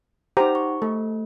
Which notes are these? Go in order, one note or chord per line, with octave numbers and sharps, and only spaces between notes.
D#4 G4 C5 F#5 A#5
C#6
A3 A4